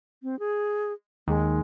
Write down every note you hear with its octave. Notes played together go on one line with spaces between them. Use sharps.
C4
G#4
D#2 G#3